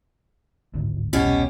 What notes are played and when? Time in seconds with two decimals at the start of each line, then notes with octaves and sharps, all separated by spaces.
0.74 D1 G#1 D2
1.13 E1 C2 B2 C#4 G4